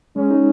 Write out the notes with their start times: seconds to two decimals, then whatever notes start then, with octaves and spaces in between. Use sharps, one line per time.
0.16 G#3 C#4
0.31 D#4